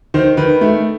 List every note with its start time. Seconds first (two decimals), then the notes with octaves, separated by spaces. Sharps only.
0.14 D#3 C5
0.37 D#3 B4
0.61 A3